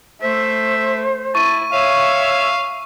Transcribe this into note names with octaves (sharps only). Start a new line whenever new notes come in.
A3 C5 E5
E4 A5 C#6 D#7
C#5 E5 F5